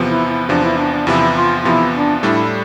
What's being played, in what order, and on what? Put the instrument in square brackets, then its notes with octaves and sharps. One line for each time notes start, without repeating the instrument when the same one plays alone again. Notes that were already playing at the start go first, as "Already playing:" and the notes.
Already playing: [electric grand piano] E2 C3 F3 B3
[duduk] E4
E4
[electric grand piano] E2 C3 F3 B3 [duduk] D4
[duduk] E4
D4
D4
[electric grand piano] E2 C3 F3 B3 [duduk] E4
[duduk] F4
[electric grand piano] E2 C3 F3 B3 [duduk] E4
[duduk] D4
[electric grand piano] A2 G3 D4 A4 [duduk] E4